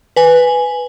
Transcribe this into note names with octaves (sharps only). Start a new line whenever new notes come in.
B4 G#5